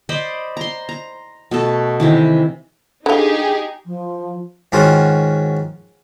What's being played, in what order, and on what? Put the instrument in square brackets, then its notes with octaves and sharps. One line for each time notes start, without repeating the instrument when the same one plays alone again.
[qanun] C5 D5 D#5 B5
A#5 C6
A#5
B2 A3 A4
C3 D#3 E3
[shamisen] D3 F4 [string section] D#4 G4 G#4
[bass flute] F3
[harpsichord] G#2 D#3 C#4 F4 F#4